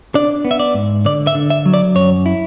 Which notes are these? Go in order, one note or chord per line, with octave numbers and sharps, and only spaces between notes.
D4 D5
B3
E5
D5
G#2
D3 D5
E5
D3
E5
F#3
D5
F#2 C#5
E4